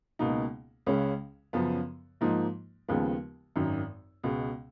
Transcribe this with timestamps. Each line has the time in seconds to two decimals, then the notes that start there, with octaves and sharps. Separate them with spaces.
0.19 C#2 B2 A#3 D#4
0.86 C#2 C#3 G#3 C#4
1.53 F#2 C#3 F3 B3
2.21 G#2 F3 A#3 D#4
2.89 D#2 C#3 F3 G#3 B3
3.56 G#1 F#2 D#3
4.23 C#2 B2 G#3